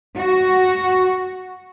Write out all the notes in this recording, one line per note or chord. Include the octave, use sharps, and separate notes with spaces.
F#4